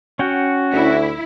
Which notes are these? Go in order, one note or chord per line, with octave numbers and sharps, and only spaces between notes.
C#4 F#4 F#5 G5
D2 E4